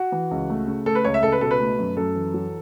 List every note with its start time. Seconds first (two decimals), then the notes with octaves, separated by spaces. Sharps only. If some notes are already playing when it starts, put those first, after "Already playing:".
Already playing: F#4
0.12 E3
0.31 C#2
0.50 A3
0.68 C#3
0.86 A3 A4
0.95 B4
1.04 C#2 C#5
1.14 E5
1.23 C#2 A4
1.32 B4
1.41 B2 A4
1.51 B4
1.60 A3
1.79 F#2
1.97 F#2 A4
2.15 E3
2.34 F#3